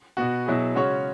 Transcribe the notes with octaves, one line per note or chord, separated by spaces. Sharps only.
B2 B3 F#4
B2 F#3 E4 G#4
C#3 G#3 C#4 F#4 C#5